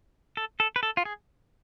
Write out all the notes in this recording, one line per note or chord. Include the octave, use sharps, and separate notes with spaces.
A4
A4
B4
A4
F4
G#4